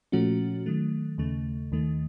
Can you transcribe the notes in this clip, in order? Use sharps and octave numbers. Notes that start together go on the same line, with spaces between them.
A#2 F3 A3 C#4 F#4
D#3 F#3 A3
D#2 C#3 A3
D#2 D#3 A3